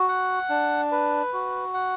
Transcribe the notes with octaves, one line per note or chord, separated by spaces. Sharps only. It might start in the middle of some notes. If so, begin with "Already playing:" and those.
Already playing: F#4
F#5
D4
B4
F#4
F#5